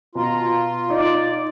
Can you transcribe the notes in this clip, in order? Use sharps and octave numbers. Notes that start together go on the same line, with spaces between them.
B2 F4 A#5
D#4 D5